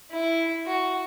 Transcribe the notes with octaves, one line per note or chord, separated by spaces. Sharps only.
E4
F#4